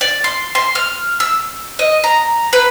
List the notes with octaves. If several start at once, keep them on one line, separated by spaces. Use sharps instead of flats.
D5
C6
C6
F6
E6
D#5
A#5
B4